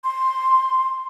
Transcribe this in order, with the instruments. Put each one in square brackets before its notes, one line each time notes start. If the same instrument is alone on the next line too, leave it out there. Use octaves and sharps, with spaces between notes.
[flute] C6